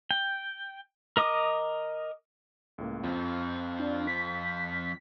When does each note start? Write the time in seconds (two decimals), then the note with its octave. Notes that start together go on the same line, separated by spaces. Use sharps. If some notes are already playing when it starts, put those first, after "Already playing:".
0.11 G5
1.17 A#4 D#5 D6 D#6
2.78 C#2 A2 A#3
3.04 F2 F3 C4
3.79 D4
4.07 B6